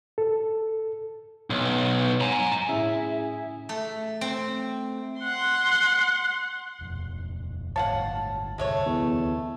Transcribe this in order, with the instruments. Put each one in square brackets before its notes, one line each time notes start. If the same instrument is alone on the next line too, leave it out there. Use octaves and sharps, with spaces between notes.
[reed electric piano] A4
[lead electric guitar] B1
G#5 A#5
[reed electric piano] A2 C#4 [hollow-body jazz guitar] E4 [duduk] G#4 [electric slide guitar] E5
[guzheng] A3
C4
[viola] F#5 C6
[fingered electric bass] D#1 F2
[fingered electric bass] G1 A2 [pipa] C#5 F5 F#5 [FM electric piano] A5
[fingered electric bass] D2 C3 [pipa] G#3 A3 C#5
[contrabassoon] E2